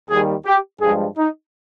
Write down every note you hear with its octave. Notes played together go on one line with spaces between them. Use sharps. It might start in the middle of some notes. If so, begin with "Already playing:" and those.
D#2 D#3 G3 G#4
G4
G2 F3 G#3 G#4
D#4